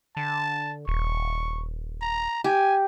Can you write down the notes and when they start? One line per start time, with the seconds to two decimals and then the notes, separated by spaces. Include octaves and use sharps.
0.17 D3 A5
0.88 D#1 C#6
2.02 A#5
2.44 G4 G#5